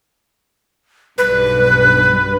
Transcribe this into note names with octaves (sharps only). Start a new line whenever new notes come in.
B1 G2 B4